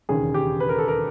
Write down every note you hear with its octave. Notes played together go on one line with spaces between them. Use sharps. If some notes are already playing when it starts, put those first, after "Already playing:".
E1 D#2 C#3 G#4
G4
B4
A#4
A4
A#4